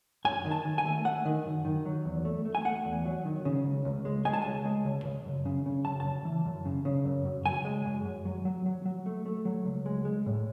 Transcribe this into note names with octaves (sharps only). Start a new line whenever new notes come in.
F#2 G#5
D#3
A5
D#3
G#5
A3
A3 F#5
D#3
F#2
D#3
F#3
E2
A3
A3
G#5
A3 F#5
E2
F#3
D#3
C#3
C#2
C#2
G#3
G#3 G#5
A5
C#2 G#5
G#3
C#2
C#3
F#2
C#3
C#3
F#2 A5
A5
C#3
E3
F#2
C#3
C#3
F#2
F#2
C#3 G#5
G#3
F#2
F#2
F#3
F#3
F#3
F#3
A3
A3
F#3
C#2
G#3
G#3
A2